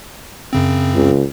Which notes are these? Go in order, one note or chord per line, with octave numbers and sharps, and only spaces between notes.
F#2 C#3 C4
C#2